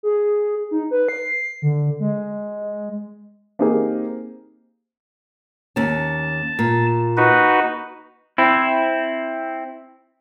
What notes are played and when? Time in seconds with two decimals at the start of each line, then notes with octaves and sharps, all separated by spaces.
0.03 G#4
0.71 D#4
0.91 B4
1.09 C7
1.62 D3
2.00 G#3
3.59 A#3 C4 D#4 G4 G#4 A#4
5.76 D#2 C#4 A5
6.59 A#2
7.17 D#4 F#4 B4
8.38 C4 E4